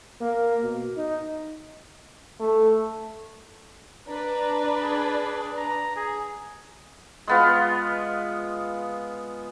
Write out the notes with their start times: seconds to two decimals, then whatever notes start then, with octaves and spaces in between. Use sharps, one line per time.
0.21 A#3
0.63 B2
0.97 D#4
2.40 A3
4.08 D4 B4 D5 A#5
4.81 G#4
5.57 A#5
5.96 G#4
7.27 G#3 B3 F4